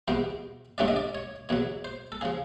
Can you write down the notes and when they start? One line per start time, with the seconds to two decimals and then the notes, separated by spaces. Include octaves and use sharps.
0.08 E2 B2 G3 B3 C5
0.78 G2 D3 F#3 A3 C#4 D5
0.88 D#5
0.96 D5
1.15 C#5
1.49 E2 B2 F#3 C#5
1.85 C5
2.12 A4
2.21 C#3 F3 G#4